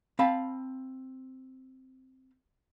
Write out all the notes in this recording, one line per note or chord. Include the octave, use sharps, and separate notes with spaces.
C4 F5 A5 B5